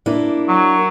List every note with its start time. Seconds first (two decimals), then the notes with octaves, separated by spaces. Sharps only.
0.06 A#3 D4 E4
0.48 F#3